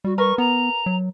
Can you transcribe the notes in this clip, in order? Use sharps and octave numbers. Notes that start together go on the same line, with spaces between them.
G3 F#4
A#4 B4 C#6
B3 A#5
F#3